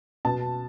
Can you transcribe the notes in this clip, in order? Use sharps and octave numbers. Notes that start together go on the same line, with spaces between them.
B2 A5